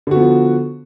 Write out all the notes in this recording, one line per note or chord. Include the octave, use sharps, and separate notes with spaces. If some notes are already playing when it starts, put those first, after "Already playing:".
D3 F3 B3 F#4